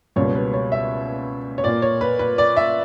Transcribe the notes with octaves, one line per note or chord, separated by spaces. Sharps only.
C#2 B2 G3 A#3 C#5
B4
C#5
E5
C#5
A#2 A#3 D5
C#5
B4
B4
D5
E5